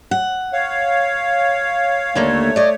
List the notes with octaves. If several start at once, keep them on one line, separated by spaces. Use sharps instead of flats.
F#5
C#5 F5
D#2 D3 A3 A#3 C#5
D5 D#5